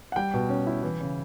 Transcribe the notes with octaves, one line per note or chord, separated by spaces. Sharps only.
F#5
G3 G5
B2
C#4
E4
E3
C#3